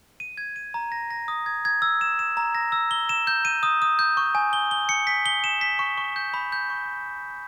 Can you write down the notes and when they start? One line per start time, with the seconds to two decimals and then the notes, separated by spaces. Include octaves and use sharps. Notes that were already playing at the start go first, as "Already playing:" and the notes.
0.20 D#7
0.38 G#6
0.56 D#7
0.74 A#5
0.92 A#6
1.10 A#6
1.28 D#6
1.46 G#6
1.65 G#6
1.82 E6
2.01 E7
2.19 E7
2.37 A#5
2.55 A#6
2.72 E6
2.91 G7
3.09 E7
3.27 G6
3.45 D#7
3.63 D#6
3.82 D#6
3.99 G6
4.17 C#6
4.35 G#5
4.53 G7
4.71 G7
4.89 C#7
5.07 B6
5.26 G7
5.44 E7
5.61 B6
5.79 C#6
5.98 C#6
6.16 G6
6.34 B5
6.52 G6
6.70 C#6